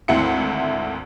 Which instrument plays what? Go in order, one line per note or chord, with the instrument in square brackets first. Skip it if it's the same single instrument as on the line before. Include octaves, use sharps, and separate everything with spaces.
[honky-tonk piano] G#1 D2 C4 E4 F#5 C#7